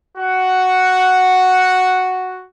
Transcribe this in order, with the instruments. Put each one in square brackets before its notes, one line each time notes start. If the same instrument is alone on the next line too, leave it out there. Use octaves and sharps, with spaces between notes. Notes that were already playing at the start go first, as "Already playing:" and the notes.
[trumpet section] F#4 F#5